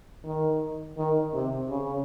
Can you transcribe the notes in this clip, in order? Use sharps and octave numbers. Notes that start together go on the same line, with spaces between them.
D#3
D#3
C3
C#3